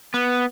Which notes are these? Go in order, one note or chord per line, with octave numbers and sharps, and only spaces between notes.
B3